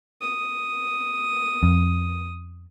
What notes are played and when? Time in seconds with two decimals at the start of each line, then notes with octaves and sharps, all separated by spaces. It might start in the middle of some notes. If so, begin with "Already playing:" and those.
0.22 D#6
1.63 F2